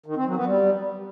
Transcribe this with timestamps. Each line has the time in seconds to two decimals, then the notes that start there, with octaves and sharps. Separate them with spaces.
0.06 D#3
0.16 C4
0.26 F#3
0.36 B3
0.46 G3